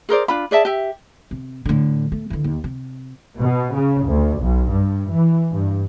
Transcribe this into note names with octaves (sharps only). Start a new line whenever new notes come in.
G#4 A#4 C5 D5
D4 F4 B5
G#4 D5 E5 A5
G4 E5
C3
A2 D3
A3
D3 E3
D#2
C3
B2
C#3
D2
B1
G2
E3
G2